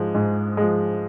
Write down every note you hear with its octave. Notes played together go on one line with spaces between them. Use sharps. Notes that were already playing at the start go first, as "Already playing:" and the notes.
Already playing: G#2 F3 G#3
G#2
F3 G#3